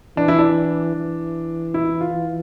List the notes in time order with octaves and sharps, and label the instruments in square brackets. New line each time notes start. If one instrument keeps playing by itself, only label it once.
[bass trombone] E3 [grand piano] D4
[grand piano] E4
D4
[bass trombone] E3
[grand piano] E4
F4